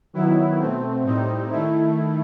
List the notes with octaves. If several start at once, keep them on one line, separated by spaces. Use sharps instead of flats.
D#3 F#3 B3 E4
B2 A3 C4
A2 G3 C4 D#4
D#3 A3 E4